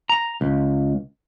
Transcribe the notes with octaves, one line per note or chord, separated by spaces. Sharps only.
A#5
C#2